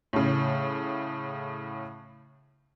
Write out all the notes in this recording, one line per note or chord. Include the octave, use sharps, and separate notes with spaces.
A2 C#3